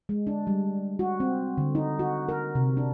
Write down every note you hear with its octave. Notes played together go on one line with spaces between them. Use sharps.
G#3
D4
G3
F#4
C4
D3
D#4
F#4
A#4
C3
D4